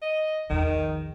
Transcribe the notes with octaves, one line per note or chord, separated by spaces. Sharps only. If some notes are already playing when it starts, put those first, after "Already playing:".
D#5
A#1 E2 D#3